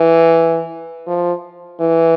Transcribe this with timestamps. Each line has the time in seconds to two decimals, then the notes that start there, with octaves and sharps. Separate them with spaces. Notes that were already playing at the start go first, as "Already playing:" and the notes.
Already playing: E3
1.07 F3
1.80 E3